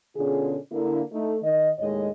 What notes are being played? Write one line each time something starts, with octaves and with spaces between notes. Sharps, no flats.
B2 D3 C#4 F4 G#4
D3 A#3 E4
A3 D#4
D#3 D#5
D#2 A2 G#3 C#5 D#5